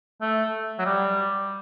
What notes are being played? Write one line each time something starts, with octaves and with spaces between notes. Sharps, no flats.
A3
F#3
G3